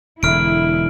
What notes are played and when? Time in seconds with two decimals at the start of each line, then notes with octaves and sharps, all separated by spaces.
0.23 E1 D3 E4 F6 D7